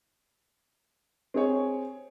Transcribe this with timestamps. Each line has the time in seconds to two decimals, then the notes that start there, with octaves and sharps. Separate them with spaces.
1.34 C4 G#4 C#5